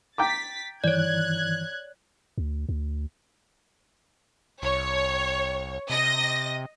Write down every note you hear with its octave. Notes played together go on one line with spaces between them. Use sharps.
G5 A#5 D6 A6 B6
G2 D#3 E3 C#5 D5 F#6 G#6
D2
D2
C2 C#5
C3 D#5 A#6